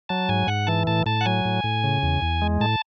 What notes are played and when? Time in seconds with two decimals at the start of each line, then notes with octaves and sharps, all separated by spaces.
0.09 F#3 A5
0.29 G#2 G#5
0.47 G#2 F#5
0.67 E3 A5
0.87 A2 A5
1.06 A2 A5
1.21 F#5
1.25 F#3 G#5
1.45 A2
1.64 A2
1.84 C#3
2.03 E2
2.22 E2
2.42 G#3
2.61 A2 A5